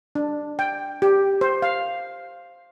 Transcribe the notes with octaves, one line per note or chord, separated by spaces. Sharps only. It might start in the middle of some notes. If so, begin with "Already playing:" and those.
D4
G5
G4
C5
F5